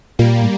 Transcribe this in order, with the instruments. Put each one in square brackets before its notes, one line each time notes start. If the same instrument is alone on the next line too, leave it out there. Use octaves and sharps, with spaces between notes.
[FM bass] A#2 [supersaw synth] G3 A#3
[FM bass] A2